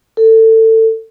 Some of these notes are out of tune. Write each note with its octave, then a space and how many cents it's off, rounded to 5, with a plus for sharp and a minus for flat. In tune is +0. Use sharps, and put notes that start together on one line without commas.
A4 +25